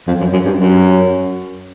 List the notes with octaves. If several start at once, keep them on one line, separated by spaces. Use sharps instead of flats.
F2
F#2
F#2
G2
F#2